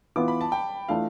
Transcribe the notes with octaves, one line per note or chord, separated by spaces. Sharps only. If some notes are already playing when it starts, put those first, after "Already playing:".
E3 B3 F4 B4 D6
B5
A5
G5
E3 A3 D4 F4 F5